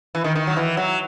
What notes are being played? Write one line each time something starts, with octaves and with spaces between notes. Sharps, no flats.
E3
D#3
D#3
F#3
E3
F#3